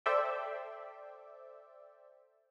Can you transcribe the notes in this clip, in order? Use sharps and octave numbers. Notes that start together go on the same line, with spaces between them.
A4 C5 D5 E5 G5